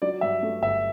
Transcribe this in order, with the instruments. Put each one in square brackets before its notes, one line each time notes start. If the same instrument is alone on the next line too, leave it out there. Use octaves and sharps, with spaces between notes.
[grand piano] F#3 D5
G2 E5
A3
G1 E5